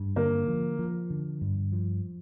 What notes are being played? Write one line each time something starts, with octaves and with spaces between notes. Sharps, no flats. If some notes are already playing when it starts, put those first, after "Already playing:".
Already playing: G2
D3 A#3
F3
F3
D3
G2
F3